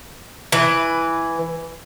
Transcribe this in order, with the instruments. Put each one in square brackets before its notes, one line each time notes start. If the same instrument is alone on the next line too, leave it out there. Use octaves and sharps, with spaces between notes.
[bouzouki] E3 B4